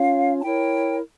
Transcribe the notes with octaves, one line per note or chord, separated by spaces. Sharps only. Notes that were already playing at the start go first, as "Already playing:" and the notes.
Already playing: C#4 F4 C#5 F5
A5
E4 A#4 C#5 G5